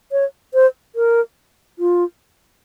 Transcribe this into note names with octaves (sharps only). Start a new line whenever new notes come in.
C#5
C5
A#4
F4